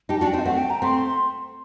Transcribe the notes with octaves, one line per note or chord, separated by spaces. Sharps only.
D#4 G4 A5
D4 F#4 A5
G5
C4 D#4
D#5
A3 C4 F#5
G5
A#5
A3 C4 C6